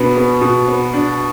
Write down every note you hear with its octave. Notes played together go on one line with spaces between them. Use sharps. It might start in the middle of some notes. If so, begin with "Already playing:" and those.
Already playing: B2 B3 D4
B3
B2
B3
D4